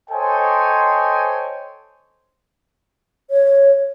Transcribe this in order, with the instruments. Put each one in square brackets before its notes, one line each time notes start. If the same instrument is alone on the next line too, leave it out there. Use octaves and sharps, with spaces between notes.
[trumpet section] A4 C5 C#5 D#5 G5 G#5
[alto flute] C#5